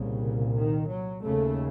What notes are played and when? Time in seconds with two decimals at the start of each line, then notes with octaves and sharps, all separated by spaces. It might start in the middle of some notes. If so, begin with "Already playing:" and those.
Already playing: C2 A#2 C#3
0.56 D#3
0.89 F#3
1.24 D#2 C#3 A3